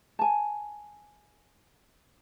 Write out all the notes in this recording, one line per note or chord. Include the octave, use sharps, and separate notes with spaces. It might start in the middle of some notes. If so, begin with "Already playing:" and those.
G#5 A5